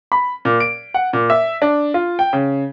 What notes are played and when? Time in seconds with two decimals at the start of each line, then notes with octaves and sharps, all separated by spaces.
0.12 B5
0.45 A#2
0.60 D7
0.94 F#5
1.13 A#2
1.30 E5
1.62 D4
1.94 F4
2.19 G5
2.33 C#3